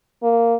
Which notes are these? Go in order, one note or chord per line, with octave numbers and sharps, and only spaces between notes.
A#3